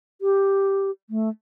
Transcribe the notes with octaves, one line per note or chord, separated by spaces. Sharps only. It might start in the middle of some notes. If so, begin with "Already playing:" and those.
G4
A3